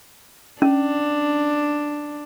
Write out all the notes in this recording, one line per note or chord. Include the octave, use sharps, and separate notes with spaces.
C#4 D4